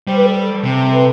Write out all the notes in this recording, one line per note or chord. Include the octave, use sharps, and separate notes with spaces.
G3 C5
B4
A4
C3
B4